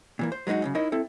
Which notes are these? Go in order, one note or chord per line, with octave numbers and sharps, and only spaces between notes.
A#2 E3 A#3
C5
F#3 G#3 B3 D#4 F#4
F#2 A2 C#3
D#4 E4 A#4 C#5 D#5
C4 E4 A4